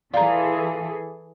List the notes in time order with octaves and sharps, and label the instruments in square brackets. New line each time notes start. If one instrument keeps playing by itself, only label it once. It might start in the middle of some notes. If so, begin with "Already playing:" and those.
[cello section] E3 G#4 A4 [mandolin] F4 [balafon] D5 A#5